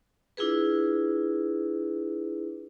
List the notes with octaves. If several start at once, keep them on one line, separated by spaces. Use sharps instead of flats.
D4 E4 F4 G#4 B4